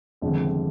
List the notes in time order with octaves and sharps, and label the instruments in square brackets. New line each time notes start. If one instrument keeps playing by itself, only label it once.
[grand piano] G1 F2 C3 D#3 G#3